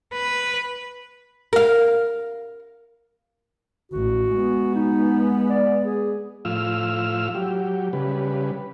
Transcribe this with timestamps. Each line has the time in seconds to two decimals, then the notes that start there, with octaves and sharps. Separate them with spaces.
0.14 B4
1.53 A#4 F5
3.92 A1 F#4
4.33 G#3 B3
4.75 D#4
5.50 D5
5.84 G#4
6.45 A2 F3 F4 E6 F6
7.35 F#3 G4
7.93 C#3 G3 B4